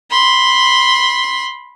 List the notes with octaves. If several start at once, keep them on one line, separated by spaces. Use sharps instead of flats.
B5 C6